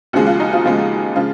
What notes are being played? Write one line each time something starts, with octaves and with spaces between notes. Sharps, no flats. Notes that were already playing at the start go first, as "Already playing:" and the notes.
D#2 C#3 F3 G#3 F#4
F4
D#4
F3 F4
D#2 C#3 F3 G#3
C#3 F3 G#3 F4